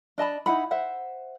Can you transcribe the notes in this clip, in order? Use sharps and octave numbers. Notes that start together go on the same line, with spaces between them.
D4 D#5 A5 B5
D#4 E4 F#5 B5
C5 E5 F#5